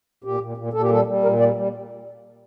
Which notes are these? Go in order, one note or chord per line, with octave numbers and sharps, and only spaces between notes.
A#2 G4
A#2
A#2
A#2 A4
G4
G3 A4
G3
A#2 A#4
G3 D5
G3